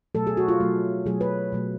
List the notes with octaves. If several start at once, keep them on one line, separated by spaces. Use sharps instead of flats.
B2 F#3 A3 A4
G#4
F#4
F4
B2 F#3 A3
B2 F#3 A3 G#4
B4
B2 F#3 A3